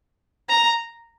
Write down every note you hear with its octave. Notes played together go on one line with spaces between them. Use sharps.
A#5